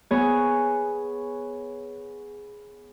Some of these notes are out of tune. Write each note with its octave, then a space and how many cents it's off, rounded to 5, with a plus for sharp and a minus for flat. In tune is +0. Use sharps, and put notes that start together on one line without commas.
B3 +0 G#4 +0 C#5 +0